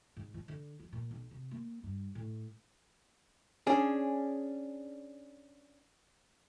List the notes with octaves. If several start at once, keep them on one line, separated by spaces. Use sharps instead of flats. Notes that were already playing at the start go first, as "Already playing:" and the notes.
G#2
F3
D3
F3
A#2
B1
C3
A#3
G2
A2
C#4 D4 G#4